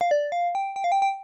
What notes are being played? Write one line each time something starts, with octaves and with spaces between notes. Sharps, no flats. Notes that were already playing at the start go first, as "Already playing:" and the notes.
F5
D5
F5
G5
G5
F5
G5
G5